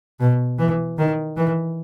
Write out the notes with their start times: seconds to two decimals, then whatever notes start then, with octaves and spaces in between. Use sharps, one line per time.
0.20 B2
0.58 E3
0.98 D#3
1.37 E3